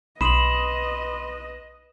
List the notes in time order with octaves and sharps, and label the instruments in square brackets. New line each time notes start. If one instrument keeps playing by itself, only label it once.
[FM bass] B1 [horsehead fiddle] B4 D#5 [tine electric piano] B5 C6 D#6 [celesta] E7 F#7